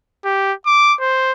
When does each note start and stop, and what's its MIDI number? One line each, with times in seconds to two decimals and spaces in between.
0.25 0.53 67
0.66 0.95 86
1.00 1.32 72